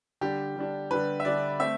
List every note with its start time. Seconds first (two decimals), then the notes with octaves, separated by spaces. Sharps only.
0.21 D3 G3 D4 G4
0.56 D3 G3 D4
0.91 D3 G3 D4 B4
1.20 E5
1.25 D3 G3 D4 D5
1.60 A3 C4 E5